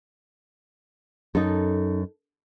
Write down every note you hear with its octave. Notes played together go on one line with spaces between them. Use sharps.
F#2 D#4 A4